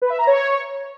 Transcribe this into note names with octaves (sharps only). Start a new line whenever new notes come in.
B4
E5
A#5
C#5